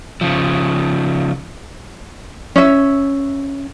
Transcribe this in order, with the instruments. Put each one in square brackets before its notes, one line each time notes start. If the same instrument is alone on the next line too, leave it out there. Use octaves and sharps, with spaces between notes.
[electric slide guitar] C#3 F3
[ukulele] C#4 E5